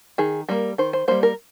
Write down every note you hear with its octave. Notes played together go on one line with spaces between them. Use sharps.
D#3 G#4
G3 A#3 A#4
D#3 C5
C5
G3 A#3 C5
A#4